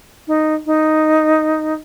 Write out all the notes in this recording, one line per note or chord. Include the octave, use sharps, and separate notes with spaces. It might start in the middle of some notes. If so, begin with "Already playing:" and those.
D#4
D#4